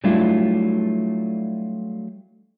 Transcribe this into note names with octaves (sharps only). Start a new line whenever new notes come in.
F#3 G3 A3 D4 E4 F4